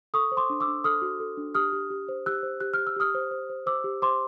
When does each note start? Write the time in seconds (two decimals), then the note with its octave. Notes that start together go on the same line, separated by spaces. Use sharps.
0.14 A4 C#6 D#6
0.32 C5
0.37 C6 D6
0.50 D4
0.60 D6 E6
0.68 D4
0.84 A4 D#6 F6
1.02 F#4
1.20 A4
1.37 D4
1.55 G4 D#6 F6
1.73 G4
1.90 G4
2.08 C5
2.26 G4 E6 F#6
2.43 C5
2.60 G4 F#6
2.74 G4 F6
2.87 E6
2.96 G4 D#6 F6
3.15 C5
3.31 C5
3.49 C5
3.66 C5 D6 E6
3.84 G4
4.02 C5 C6 D6